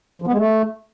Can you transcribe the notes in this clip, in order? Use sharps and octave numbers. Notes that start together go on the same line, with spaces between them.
F3
B3
G#3
A3